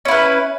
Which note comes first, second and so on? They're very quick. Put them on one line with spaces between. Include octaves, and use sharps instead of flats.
C#4 E4 B4